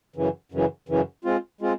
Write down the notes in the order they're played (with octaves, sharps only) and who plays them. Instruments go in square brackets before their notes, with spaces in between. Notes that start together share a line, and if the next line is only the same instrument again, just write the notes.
[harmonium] F#2 C#3 E3
F#2 C#3 E3
F#2 C#3 E3
G#3 C4 F4
G#3 C4 F4